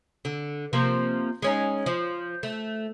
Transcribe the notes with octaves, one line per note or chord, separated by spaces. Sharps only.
D3
C3 F3 A#3
G#3 C#4 D#4
F3
A3